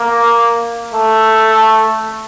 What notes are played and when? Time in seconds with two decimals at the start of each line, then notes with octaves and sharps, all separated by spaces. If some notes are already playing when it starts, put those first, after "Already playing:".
Already playing: A#3
0.94 A3